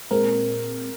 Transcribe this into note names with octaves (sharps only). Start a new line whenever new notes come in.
A#2 G#3 C4 A#4